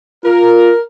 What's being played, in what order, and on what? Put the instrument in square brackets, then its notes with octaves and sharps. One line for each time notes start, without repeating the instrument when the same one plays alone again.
[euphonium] F4 [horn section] A#4